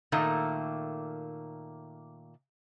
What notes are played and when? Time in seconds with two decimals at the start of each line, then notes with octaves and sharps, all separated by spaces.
0.12 A#2 D#3 A3 A#3